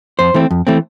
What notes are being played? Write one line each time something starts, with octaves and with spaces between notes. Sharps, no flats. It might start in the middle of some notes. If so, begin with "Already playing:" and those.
F2 C5
E3 A3 C4
F2
E3 A3 C4